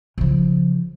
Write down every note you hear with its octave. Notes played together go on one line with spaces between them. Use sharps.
C#3 F3